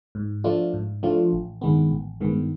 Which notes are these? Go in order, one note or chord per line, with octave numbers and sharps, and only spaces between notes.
G#2
F3 A3 D4 F4
G#2
F3 A3 D4 F4
A1
G2 D#3 G#3 B3
A1
G2 D#3 G#3 B3